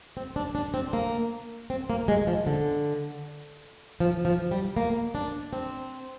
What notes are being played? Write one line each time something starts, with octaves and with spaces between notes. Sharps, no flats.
C4
D4
D4
C4
A#3
C4
A#3
G#3
F3
D3
F3
F3
G3
A#3
D4
C4